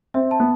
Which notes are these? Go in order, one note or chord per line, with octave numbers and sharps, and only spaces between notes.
C4 E5
A5
B3